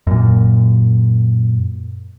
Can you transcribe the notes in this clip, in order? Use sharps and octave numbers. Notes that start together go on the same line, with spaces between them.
F#2 A#2